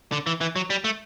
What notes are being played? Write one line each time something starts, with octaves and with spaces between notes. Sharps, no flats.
D3
E3
E3
F#3
G3
A3